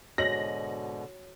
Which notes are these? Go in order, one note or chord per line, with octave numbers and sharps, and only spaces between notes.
G#2 B2 D3 F#4 C#5 D#5 A#6 F#7